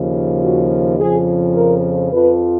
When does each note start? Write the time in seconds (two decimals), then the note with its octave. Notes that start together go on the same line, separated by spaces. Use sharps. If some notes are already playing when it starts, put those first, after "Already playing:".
Already playing: D#2 C#3 F3
0.43 F#4
0.99 F2 C#3 F3 G#4
1.56 A#4
2.11 F2 F3 B4